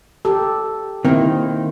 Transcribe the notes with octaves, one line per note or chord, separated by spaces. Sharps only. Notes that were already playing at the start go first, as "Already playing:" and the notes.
G4 A4
D#3 A#3 C4 E4